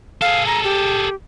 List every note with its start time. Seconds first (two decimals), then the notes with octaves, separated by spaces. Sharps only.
0.21 G#4 A4 F5
0.46 A#5
0.64 G4